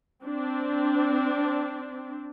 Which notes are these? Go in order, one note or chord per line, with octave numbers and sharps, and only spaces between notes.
C4 D4